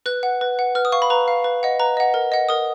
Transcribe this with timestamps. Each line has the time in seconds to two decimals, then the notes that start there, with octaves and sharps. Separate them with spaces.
0.06 B4 F#6
0.23 F#5
0.41 B4
0.59 F#5
0.75 B4 F6
0.85 D#6
0.92 F5 C#6
1.02 B5
1.10 B4 A#5
1.28 F5
1.44 B4
1.63 D#5 F#5
1.80 B4 A#5
1.97 D#5 F#5
2.14 A#4
2.32 D#5 F#5
2.49 A#4 D#6